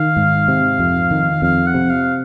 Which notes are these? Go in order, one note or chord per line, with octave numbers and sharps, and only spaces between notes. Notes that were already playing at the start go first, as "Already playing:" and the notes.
Already playing: D#3 F5
G#2
C3
F2
D#3
F2 F5
F#5
C3
F5